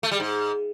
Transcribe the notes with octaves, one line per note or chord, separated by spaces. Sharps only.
A3
G3
G#2